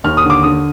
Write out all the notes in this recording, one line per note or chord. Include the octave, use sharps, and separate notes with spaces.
D#2 F6
D#6
D3
D6
D3 D#6